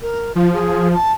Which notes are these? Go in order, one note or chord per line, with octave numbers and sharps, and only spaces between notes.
A#4
F3 F4
G#4
A5